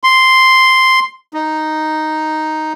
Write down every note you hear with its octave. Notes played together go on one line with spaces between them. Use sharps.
C6
D#4